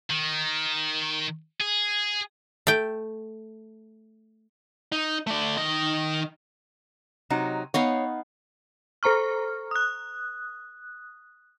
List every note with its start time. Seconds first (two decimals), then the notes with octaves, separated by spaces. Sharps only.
0.10 D#3
1.60 G#4
2.67 A3 G5
4.92 D#4
5.27 A3 D5
5.57 D#3 D#5
7.30 C3 F#3 D#4
7.74 B3 D#4 C#5 F5
9.03 A4 C5 A#5 C#6 F6
9.71 D#6 F#6